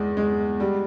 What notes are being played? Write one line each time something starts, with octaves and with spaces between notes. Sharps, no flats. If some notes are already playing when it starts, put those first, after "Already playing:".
Already playing: E2 G#3
G#3
G3